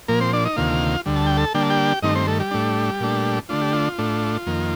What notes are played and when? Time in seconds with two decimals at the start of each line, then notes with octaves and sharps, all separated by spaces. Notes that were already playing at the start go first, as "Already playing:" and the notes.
0.08 A#2 F3 A#3 A#4
0.20 C4 C5
0.33 D4 D5
0.45 D#4 D#5
0.56 D2 C3 D#3 A#3 F4 F5
1.06 D2 D3 G3
1.16 A5
1.27 G5
1.37 A4 A5
1.54 D3 G3 A#3 D4 G5
1.62 A5
1.70 G4 G5
2.03 G2 D#3 A3 C4 D#4 D#5
2.15 C4 C5
2.27 A3 A4
2.40 G3 G4
2.51 A2 A3 D4
3.00 A#2 A3 D4
3.49 D3 A3 D4 F4
3.61 G4
3.73 F4
3.98 A2 A3 D4
4.47 F2 D#3 A#3